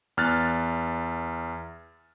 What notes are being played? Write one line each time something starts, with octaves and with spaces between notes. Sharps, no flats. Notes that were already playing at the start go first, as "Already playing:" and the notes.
E2 F6 F#6 A6